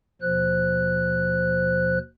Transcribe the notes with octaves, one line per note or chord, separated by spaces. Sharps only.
D#2 B2 F3 C5 F#6